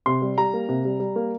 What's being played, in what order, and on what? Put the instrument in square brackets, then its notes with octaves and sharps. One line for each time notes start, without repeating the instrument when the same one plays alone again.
[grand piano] C3 C6
G3
G3 A#5
A#3
C3
G3
G3
A#3